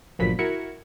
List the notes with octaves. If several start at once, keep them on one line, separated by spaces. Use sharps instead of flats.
G1 A#2 F3 F#3 B5 B6
E4 F#4 A#4 G#6 C#7